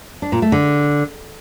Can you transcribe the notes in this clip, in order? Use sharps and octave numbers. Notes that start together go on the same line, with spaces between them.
D4
A#2
A3
D3